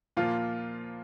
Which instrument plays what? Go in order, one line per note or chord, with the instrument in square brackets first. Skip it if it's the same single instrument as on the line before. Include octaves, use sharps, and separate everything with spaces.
[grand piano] A#2 F3 A#3 F4